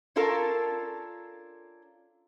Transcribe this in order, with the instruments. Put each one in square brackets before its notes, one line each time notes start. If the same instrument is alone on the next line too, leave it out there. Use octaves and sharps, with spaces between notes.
[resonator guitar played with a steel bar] C#4 D4 F4 A4 A#4